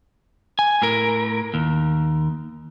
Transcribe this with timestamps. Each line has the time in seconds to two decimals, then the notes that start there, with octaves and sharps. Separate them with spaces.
0.59 G#5
0.82 A2 A#4
1.54 D#2